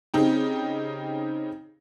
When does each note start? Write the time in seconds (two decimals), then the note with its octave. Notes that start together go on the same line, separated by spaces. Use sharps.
0.14 C#3 C4 D#4 G4